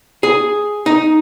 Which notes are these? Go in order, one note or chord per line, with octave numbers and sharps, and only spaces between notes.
G#4
D#4